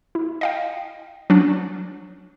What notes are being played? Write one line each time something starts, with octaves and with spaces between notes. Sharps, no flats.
E4
D#5 F5 G5
F#3 C#4 D4